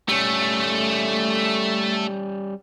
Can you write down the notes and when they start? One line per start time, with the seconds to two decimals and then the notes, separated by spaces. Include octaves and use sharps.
0.09 G3 A3 C#4